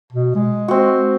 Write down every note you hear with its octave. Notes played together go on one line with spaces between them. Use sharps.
B2
G#3
C4 F#4